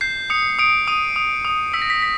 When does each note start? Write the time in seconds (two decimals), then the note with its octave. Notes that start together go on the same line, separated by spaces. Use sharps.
0.01 G6 C7
0.30 D#6 C#7
0.59 D#6 D7
0.88 D#6 D#7
1.16 D#6
1.45 D#6
1.74 E6 B6
1.82 A#6
1.90 B6
2.02 B6